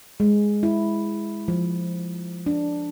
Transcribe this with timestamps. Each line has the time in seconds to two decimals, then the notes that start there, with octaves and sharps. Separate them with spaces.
0.20 G#3
0.63 E4
1.48 F3
2.46 D4